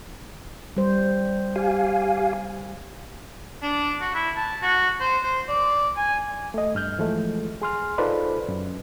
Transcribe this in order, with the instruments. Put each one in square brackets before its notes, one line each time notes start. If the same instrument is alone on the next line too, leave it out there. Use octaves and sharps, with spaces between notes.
[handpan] G3 C5
[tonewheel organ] G4 F5 G#5
[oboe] D4
F#4
E4
A5
F#4
C5
C5
D5
G#5
[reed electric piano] A3 D#5
G2 F6 G6
E3 F3 G#3 A3
G#4 C6 F6
D#4 F4 A4 B4 C5 D5
F#2